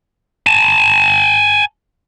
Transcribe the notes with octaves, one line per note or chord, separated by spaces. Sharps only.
G#5 A5